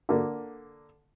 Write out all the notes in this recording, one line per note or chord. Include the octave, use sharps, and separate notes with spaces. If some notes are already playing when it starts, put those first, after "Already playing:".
D3 A#3